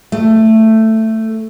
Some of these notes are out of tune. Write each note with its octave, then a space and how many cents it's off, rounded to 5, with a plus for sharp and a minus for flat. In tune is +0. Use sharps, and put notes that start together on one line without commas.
A3 +10